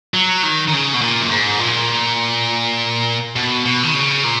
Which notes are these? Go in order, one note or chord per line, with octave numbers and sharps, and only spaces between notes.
F#3
D#3
D#3
C#3
B2
A#2
F#2
G#2
A#2
B2
B2
D#3
C#3
A#2